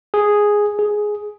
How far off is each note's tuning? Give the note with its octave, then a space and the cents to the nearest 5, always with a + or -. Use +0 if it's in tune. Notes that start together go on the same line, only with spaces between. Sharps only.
G#4 +0
G#4 +10